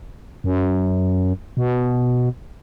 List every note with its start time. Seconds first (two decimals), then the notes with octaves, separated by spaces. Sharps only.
0.44 F#2
1.57 B2